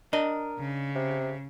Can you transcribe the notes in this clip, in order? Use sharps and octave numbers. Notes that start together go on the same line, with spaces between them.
D4 A#4 D#5
C#3
C3